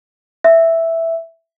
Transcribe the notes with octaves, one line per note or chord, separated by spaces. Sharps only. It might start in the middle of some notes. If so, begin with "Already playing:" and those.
E5